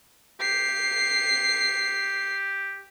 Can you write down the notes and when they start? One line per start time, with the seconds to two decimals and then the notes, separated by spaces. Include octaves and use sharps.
0.40 G4 C7